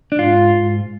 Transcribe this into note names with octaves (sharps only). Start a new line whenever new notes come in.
D4
G#2 F4